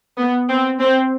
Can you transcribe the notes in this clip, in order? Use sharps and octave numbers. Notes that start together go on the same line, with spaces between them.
B3
C4
C4